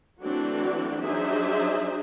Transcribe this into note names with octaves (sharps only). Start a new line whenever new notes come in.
E3 F#3 A3 C4 D4 F#4
F#3 D4 D#4 G#4 C5 E5